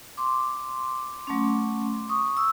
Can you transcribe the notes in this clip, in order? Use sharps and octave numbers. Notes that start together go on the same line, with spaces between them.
C6 D6
F#3 A3 C#4
C#6 D#6
E6